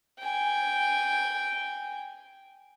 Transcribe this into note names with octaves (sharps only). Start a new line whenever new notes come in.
G5 G#5